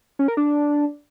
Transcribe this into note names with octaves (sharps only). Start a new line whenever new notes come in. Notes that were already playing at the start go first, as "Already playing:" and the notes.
C#4
A#4
D4